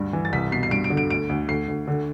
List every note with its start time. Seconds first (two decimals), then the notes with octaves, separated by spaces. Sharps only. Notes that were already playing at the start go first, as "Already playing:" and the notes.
Already playing: D2 G2
0.13 E3
0.25 A6
0.33 C2 B6
0.52 B2 C7
0.63 C7
0.71 G2 D7
0.84 D7
0.90 D3
0.97 D7
1.10 D2 D7
1.29 D2
1.48 D2 C7
1.68 D2
1.87 D3